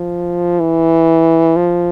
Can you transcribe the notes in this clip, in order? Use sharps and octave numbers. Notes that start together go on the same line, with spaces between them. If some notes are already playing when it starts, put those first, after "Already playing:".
Already playing: F3
E3
F3